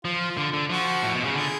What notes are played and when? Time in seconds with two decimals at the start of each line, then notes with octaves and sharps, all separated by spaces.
0.04 F3 F4
0.37 D3
0.53 D3
0.69 F3 F#4
1.03 A2
1.15 B2
1.24 C#3
1.35 D3 G#4